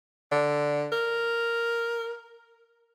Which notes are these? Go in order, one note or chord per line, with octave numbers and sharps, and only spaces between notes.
D3
A#4